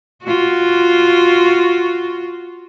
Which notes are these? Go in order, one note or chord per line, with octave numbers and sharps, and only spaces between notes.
F4 F#4